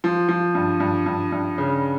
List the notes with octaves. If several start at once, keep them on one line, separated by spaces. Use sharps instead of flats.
F3
F3
G2
G2
G2
G2
C#3